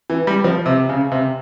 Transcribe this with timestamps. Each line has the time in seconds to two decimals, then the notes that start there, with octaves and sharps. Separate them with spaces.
0.10 E3
0.27 G3
0.44 F3
0.66 C3
0.89 C#3
1.12 C3